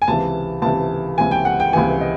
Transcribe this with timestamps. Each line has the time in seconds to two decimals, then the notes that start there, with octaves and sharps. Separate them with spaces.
0.02 G#5
0.08 C#2 C3 E3 A5
0.62 C#2 C3 E3 A5
1.18 C#2 C3 E3 G#5
1.31 G5
1.45 F#5
1.60 G5
1.73 C#2 C3 E3 G#5
2.01 D#5